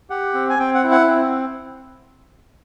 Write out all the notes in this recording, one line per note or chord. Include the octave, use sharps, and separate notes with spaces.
G4 F#5
C4
G#5
C4 G5
F#5
E4
F#5
C4